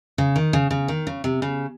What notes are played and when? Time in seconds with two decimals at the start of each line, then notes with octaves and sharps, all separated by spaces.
0.18 C#3
0.36 D#3
0.53 C#3
0.71 C#3
0.88 D#3
1.07 C#3
1.24 C3
1.42 C#3